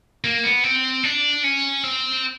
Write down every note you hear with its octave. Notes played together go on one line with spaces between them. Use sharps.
A#3
B3
C4
D4
C#4
C4